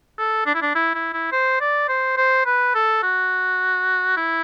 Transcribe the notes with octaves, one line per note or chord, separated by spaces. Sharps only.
A4
D4
E4
D4
E4
E4
E4
C5
D5
C5
C5
B4
A4
F#4
E4